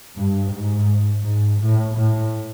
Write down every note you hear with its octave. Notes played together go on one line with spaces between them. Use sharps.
G2
G#2
G#2
A2
A2